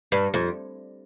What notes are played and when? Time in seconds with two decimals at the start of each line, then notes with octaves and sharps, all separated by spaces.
0.12 G2
0.34 F2